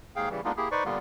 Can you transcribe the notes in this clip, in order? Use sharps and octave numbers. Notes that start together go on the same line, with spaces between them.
D#2 G#2 G#4 F5 G5
C#3 E3 G3
G#3 A#3 B3 D4 D#4 F4
A#3 E4 G4 G#4
D#4 B4 C5 D5 C#6
A#2 D3 G3 A#3 B3 F4